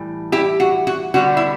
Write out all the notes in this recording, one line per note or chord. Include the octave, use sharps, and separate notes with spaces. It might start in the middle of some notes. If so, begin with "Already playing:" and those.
Already playing: A2 E3 G3
E4 G4
F#4
F#4
D3 G3 B3 F#4
E4